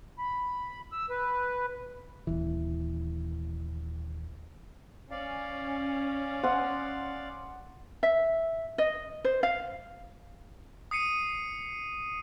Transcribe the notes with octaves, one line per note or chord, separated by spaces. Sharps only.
B5
E6
B4
D#1 E3
C#4 D5 F5
F#5 C6 D#6
E5
D#5
C5
F5
D#6 C7 C#7 D#7